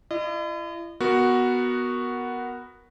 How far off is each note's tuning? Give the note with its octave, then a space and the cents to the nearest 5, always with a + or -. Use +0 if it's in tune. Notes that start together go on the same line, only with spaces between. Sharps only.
E4 +40 D#5 -35
B3 +0 F#4 +0 A#4 +0